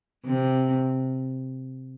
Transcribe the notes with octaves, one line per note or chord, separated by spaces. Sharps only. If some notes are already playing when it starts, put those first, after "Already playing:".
C3